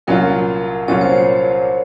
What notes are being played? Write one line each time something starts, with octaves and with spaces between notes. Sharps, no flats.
C2 A#2 F#3 C#4 F4 A#4
C2 A#2 F#3 C#4 F4 C#5
C5
C#5